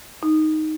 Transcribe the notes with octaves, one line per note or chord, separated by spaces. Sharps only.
D#4